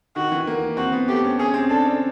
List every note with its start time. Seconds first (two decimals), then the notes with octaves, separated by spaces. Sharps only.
0.16 D#3 F#4
0.32 E3
0.47 A#3
0.77 C4 F#4
0.92 B3
1.08 A3 G4
1.24 C#4
1.39 C#4 G#4
1.54 C4
1.70 D4 A4
1.85 D4